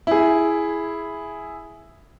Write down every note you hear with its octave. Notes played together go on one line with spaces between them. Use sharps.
E4 G#4